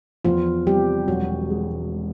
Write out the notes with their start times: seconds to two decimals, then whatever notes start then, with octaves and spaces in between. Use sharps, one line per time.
0.25 E2 F3 F4
0.67 C3 G3 G4
1.08 E1 F#3 F#4
1.50 G#3